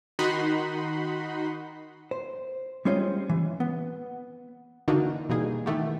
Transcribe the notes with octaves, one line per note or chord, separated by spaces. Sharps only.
D#3 D#4 F#4 F#5 B5 C6
C5
G3 G#3 C#4 F4 C5 D#5
E3
B3
D3 E3 A#3 D4 D#4 F#4
B2 E3 G3 A#3 D#4 G#4
D#3 E3 A3 B3 G4